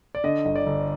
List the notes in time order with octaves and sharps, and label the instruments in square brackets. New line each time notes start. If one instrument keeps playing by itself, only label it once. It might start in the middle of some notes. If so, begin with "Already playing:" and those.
[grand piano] D5
D3 D#5
G1 D#5
D5
G1